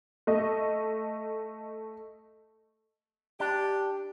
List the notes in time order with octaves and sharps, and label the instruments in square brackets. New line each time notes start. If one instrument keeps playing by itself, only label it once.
[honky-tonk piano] A3 D#5
[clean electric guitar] D4 [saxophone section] G4